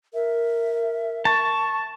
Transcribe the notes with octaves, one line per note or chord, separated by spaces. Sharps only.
A#4 E5
A5 C#6